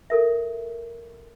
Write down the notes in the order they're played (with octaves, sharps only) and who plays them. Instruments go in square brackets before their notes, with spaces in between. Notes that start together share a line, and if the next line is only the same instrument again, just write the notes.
[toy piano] A4 A#4 E5